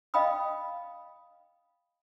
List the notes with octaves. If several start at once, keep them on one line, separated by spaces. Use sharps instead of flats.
D#5 F5 G5 B5 D#6